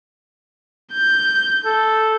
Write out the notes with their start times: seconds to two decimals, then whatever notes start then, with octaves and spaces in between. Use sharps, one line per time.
0.93 G6
1.65 A4